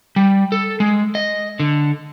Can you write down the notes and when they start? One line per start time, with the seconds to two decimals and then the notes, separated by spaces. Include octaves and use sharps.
0.16 G3
0.52 A4
0.80 G#3
1.15 D#5
1.60 D3